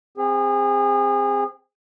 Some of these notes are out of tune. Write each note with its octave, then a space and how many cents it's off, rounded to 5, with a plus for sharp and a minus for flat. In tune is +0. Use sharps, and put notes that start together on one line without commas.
C4 -5 G#4 -30